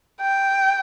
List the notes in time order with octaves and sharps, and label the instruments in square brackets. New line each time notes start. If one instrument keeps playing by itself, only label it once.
[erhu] G5